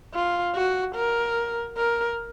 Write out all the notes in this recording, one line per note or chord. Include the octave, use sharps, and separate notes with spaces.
F4
F#4
A#4
A#4